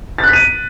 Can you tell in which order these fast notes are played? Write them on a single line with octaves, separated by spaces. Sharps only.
A6 F#6 B6 D#7